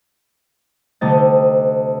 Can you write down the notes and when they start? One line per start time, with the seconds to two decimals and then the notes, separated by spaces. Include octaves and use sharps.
1.01 D2 C3 A3 D#5 A6